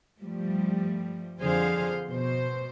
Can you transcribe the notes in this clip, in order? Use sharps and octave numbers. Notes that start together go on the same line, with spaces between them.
G2 F3 G3 A3
F2 D3 F3 G#4 C5 F5
B2 C5